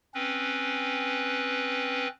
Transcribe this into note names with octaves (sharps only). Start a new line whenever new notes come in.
C4 C#4 B4